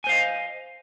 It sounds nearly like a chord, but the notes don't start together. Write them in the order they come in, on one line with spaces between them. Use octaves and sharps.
G#5 C5 F5 D#5